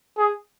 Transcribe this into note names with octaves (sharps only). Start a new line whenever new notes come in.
G#4